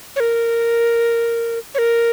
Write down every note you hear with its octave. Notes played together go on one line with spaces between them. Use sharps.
C#5
A#4
C#5
A#4